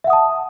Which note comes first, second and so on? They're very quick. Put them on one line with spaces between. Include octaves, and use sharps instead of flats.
E5 F#5 D#6 A5